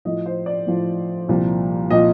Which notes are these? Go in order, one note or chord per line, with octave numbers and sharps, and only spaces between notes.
A2 F3 D#5
C5
D5
A2 F3
C2 A#2 F3
A#2 F3 D#5